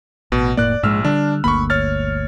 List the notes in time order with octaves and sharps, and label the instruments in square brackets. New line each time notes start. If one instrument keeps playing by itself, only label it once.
[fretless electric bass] A1 [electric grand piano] B2
[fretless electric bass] F1 A2 A#3 [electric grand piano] D5 F#6
[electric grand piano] A#1 E6 F6 [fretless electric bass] G#2 G#3
[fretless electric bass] D3 G3 [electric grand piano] D4
[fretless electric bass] G1 D2 A#3 [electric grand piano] B5 C#6
[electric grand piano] C#5 F6 A6